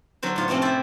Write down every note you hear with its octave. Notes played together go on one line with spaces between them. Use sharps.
D3 F#3 C5
A2 F4 C#5
C3 F3 A3 C4 C#4
E4 F4 G4 C5 D5